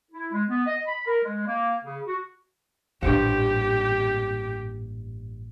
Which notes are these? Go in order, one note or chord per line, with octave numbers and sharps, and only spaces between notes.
E4
G#3
B3
D#5
B5
A#4
G#3
A#3
C#3
F#4
A1 G2 A#2 G4 C5 F#5